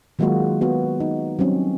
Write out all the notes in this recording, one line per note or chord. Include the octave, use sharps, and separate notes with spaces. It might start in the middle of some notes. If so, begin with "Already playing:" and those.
D#3 F#3 G#3 A#3 F4 F#4
B3 F#4
D#4
F#3 G3 C4 C#4